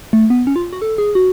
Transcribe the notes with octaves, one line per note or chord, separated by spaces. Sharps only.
A3
B3
C#4
F4
F#4
A4
G#4
F#4